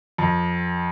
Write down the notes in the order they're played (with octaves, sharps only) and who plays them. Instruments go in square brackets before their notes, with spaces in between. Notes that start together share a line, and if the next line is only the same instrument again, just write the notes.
[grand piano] F2